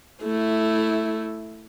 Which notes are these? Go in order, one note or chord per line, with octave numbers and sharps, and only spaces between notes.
A3 E4